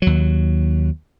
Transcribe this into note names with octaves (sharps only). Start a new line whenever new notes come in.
D#2 F#3